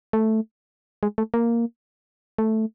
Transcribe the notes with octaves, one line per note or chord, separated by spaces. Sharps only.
A3
G#3
A3
A#3
A3